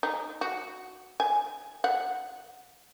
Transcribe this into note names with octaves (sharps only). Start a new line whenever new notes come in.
D#4
F#4
G#5
F#5